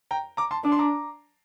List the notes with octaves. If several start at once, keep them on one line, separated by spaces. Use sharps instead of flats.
G5 A#5
A#5 D6
A5 C6
D4 D6
C6
A#5 D6